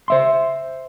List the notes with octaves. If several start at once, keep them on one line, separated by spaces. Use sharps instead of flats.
C5 E5 C6